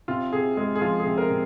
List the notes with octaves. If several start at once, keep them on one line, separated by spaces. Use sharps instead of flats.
C3 F4
C3 G#4
G#3 G#4
G#4
F3 F4
G#4
C3
A#4
C3